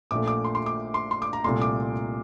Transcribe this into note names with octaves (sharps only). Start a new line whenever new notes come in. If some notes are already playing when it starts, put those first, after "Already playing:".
A#1 A#2 A3 D6
D6
C6
C6
D6
C6
C6
D6
A#5
C2 A#2 A3 C6
D6